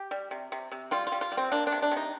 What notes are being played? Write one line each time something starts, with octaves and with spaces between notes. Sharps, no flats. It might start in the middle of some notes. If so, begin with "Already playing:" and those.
Already playing: G4
G3
C3
C3
C3
G3 F4
F4
G3
F4
G3
C4
A#3 D4
D4
C3
D4
C3
D#4